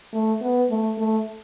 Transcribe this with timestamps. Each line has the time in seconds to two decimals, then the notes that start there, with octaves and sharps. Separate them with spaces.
0.13 A3
0.41 B3
0.70 A3
0.98 A3